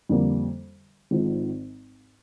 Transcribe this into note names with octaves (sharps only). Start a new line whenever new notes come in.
F2 D3 G3 A#3
G#1 G#2 F3